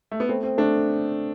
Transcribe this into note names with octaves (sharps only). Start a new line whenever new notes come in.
A3
B3
A3 C4
C4
A3 D4